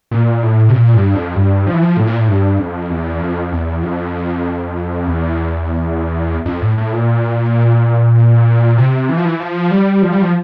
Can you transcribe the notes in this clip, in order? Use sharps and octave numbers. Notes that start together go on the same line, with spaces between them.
A#2
A2
C3
A#2
G2
F2
G2
F3
E3
F3
A2
A#2
A2
G2
F2
E2
F2
E2
F2
E2
F2
A2
A2
A#2
C3
E3
F3
E3
F3
G3
F3
G3
F3